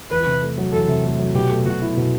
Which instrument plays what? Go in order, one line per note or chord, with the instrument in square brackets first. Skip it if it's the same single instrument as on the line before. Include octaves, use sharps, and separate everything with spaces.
[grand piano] E2 [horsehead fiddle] B4
[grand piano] C3
A3
F#3
[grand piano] E2 [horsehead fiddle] A4
[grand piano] C3
A3
F#3
[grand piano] B2 [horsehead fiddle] G4
[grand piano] A3
[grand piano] B2 [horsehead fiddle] F#4
[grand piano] E4
B2